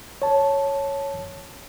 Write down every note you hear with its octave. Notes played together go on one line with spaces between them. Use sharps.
C#5 A5